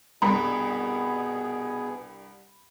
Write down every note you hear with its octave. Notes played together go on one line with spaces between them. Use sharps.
C2 G2 B2 B3 G#4 B5